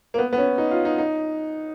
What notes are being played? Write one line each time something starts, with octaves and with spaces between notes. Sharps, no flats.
A#3
B3
B3
C#4
D#4
F4
D#4
D#4